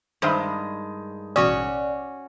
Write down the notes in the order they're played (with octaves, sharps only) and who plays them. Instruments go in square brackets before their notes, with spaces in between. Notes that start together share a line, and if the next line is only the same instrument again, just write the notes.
[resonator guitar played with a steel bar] G2 D#3 G#3 [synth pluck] C5 E5 B5
[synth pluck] A1 B2 D#6 [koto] C#4 F#4 C#5 [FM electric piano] D5